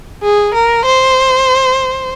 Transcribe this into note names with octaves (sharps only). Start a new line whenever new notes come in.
G#4
A#4
C5